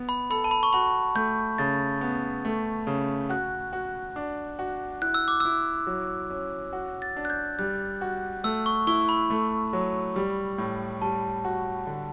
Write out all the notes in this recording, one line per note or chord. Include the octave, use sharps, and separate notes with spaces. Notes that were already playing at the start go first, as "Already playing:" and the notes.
Already playing: B3
B5
A4 B5
A5
B5
C#6
F#4 B5
A3 G6
C#3 A6
B3
A3
C#3
F#4 F#6
F#4
D4
F#4
E4 F#6
E6
D6
E4 E6
F#3
C#4
F#4
A6
D4
F#6
G6
G3 F#6
F#4
A3 E6
C#6
E4 C#6
B5
A3
F#3
G3
A2
G3 A5
F#4
D3